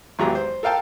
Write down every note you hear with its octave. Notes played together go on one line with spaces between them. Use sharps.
G#1 E2 F#3 G4 G#4 A#5
C5
A4 A#4 F5 G5 A5